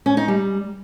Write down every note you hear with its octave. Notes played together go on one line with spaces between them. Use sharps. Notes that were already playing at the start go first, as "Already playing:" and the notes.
C#4
D#4
G3